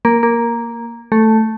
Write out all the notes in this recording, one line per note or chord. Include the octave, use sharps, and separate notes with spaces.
A#3
A#3
A3